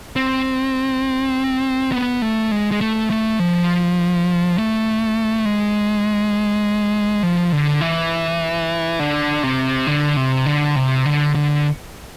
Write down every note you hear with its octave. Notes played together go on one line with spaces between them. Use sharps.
C4
B3
A3
G#3
G#3
A3
A3
F3
A3
G#3
F3
D3
E3
D3
C3
D3
C3
D3
C3
D3
D3